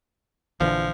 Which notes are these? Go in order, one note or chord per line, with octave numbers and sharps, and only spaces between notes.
A#1 D3 E3 F3